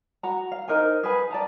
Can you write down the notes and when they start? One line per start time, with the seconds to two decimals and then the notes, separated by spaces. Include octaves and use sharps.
0.23 F#4 A#5
0.52 F5
0.68 D#4 A#4 C5 G#5
1.03 G#4 B4 G#5
1.31 D5 A5 A#5